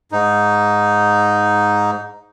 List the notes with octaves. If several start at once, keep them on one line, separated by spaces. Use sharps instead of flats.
G#2 D#4